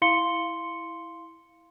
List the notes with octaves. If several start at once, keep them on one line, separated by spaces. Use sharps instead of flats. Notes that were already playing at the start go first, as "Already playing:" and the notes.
E4 F5 C6 C#7 G7